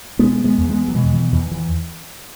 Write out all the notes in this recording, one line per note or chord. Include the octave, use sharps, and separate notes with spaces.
B2 G#3 B3
G#3 B3
E2
G#3 B3
F#3
B2 E3 G#3
E3
E2 E3
E3